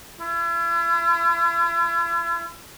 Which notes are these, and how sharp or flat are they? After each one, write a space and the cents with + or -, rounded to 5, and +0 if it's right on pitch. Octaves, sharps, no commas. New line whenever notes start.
E4 +45